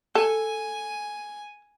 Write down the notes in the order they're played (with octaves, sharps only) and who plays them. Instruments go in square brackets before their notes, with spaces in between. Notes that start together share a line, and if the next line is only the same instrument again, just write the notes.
[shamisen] A4 [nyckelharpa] G#5